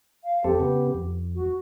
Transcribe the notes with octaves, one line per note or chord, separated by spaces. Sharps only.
F5
F2 C4 G4 A4
C#3 B3
F2
F#4